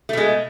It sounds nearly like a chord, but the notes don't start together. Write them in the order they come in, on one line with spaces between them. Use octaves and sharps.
A3 B2 G#3